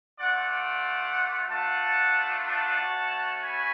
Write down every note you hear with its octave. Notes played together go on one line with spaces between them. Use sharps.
A3 F4 D5 F#5
D5 F#5
A3 D4 F4 F#5 A5
F#5 A5
A3 C#4 F#4
G#5 B5